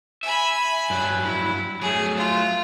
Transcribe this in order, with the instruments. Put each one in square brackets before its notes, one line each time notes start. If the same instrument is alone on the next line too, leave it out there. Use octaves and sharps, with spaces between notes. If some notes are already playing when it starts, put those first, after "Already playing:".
[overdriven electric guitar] E5 [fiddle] G#5 B5
[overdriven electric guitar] G2 F#3
[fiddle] E4
[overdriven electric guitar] F#3 A3 [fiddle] G#4
[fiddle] F4